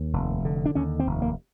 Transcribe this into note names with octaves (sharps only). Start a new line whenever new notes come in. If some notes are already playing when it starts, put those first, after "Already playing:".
Already playing: D#2
F1
D3
D4
D#2 C#4
C4
F1
A#3